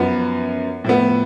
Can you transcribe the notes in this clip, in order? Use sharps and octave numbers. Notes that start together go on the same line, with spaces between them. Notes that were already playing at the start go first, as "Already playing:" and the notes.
Already playing: F#2 F3 B3
A2 F3 B3